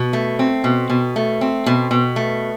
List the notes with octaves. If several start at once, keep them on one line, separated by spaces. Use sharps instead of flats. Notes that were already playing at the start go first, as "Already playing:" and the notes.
Already playing: B2
A3
C4
B2
B2
A3
C4
B2
B2
A3